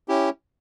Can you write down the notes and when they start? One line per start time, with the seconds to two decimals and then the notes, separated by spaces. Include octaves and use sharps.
0.08 C#4 E4 G4